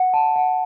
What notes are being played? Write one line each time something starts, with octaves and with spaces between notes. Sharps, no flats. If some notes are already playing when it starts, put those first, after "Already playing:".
Already playing: F#5
A5
F#5